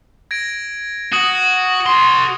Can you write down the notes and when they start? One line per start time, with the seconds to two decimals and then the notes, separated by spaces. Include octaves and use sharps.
0.31 G#6 A#6 D7
1.13 F#4 D#6 F#7
1.86 F#4 C6